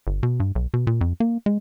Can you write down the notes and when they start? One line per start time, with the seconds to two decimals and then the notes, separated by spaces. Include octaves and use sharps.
0.07 G1
0.23 B2
0.40 G2
0.55 B1
0.74 B2
0.87 A#2
1.01 F2
1.20 A#3
1.46 G#3